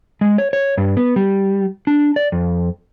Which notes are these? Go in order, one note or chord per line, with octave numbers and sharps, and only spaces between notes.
G#3
C#5
C#5
G2
B3
G3
D4
D5
F2